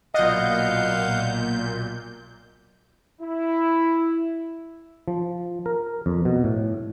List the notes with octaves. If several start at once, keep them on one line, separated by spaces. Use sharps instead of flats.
B1 A#2 D5 D#5 F5 F#5 G6
E4
F3
A#4
F2
B2
A2